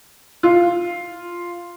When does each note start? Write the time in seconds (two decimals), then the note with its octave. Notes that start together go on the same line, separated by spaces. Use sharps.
0.43 F4